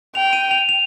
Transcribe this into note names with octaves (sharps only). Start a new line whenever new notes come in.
G5 F7
D#7
F7
F7